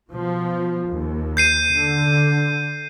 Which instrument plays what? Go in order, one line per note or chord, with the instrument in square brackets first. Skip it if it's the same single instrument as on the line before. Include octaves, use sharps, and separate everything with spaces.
[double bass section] B2 F3
D#2
[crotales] G6 C7 D#7
[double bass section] D3